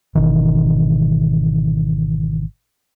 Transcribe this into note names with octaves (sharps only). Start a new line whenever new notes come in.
G#1 B2 D#3 E3